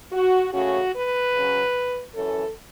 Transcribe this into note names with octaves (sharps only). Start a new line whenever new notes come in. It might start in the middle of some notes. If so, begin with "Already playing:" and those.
F#4
C#3 A3 C#4 F#4
B4
C#3 F#3 C#4
F#2 E3 C#4 A4